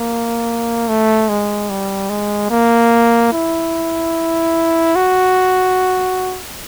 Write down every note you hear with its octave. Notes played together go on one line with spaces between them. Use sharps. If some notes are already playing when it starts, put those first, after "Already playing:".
Already playing: A#3
A3
G#3
G3
G#3
A#3
E4
F#4